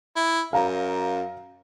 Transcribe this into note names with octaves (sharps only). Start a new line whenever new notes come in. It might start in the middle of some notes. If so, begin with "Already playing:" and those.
E4
F#2 F5 A#5